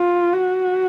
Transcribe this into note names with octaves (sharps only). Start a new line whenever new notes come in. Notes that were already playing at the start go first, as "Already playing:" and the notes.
Already playing: F4
F#4